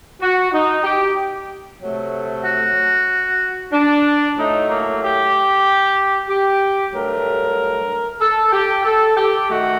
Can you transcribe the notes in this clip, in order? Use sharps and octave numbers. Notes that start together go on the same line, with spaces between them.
F#4
D#4
G4
C3 F#3 A3
F#4
D4
A2 F#3 A3 D#4
A#3
G4
G4
G2 F#3 A3 A#4
A4
G4
A4
G4
D#3 A3 F#4